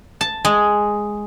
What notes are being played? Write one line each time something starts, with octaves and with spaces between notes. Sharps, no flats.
A5
G#3